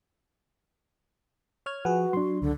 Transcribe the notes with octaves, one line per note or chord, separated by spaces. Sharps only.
C#5 F6 G#6
F3 F#4 G#4 B4 F#5
F#3 D4 C6
C#2 D3